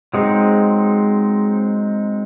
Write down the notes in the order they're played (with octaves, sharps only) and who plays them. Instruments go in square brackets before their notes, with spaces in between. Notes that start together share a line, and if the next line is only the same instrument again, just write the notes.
[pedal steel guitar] F#3 G#3 C4 D#4